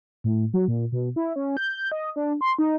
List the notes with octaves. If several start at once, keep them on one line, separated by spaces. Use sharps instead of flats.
A2
F#3
A#2
B2
E4
C#4
G6
D#5
D4
C6
D#4